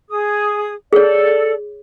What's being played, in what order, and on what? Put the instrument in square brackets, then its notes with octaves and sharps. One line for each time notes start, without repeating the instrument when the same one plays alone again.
[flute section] G#4 D#6
[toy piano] G#4 C#5 [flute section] A4 D5